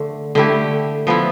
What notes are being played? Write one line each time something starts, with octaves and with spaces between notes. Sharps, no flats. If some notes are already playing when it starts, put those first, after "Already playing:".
Already playing: D3 A3
D3 A3 E4 G4
F3 B3 E4